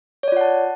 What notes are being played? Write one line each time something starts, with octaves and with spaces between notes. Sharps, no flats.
F4 C#5 D5 F#5 A5